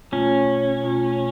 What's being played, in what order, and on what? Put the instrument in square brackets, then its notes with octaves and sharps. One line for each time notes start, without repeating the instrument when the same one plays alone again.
[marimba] B2 A3 F4 [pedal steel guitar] C#4
[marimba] B2 A3 F4